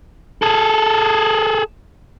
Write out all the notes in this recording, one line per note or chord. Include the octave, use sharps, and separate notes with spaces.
G#4 A4